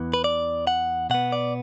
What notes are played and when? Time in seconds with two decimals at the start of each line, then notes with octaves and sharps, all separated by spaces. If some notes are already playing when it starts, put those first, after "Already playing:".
Already playing: E2 E3 B3
0.14 B4
0.24 D5
0.67 F#5
1.10 B2 B3 F#5
1.32 D5